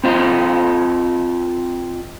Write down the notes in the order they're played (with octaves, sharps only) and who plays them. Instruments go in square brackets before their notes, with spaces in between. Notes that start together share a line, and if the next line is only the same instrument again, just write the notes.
[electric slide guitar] C4 D4 F4 D#5 A#5